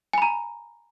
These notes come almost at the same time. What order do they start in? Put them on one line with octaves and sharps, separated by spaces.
G#5 B5 A#5